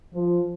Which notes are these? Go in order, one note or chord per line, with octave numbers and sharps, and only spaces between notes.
F3